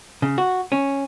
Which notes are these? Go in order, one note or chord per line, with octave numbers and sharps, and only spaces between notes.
C#3
F#4
C#4